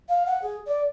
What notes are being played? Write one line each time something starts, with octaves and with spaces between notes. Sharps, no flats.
F5
F#5
G#4
D5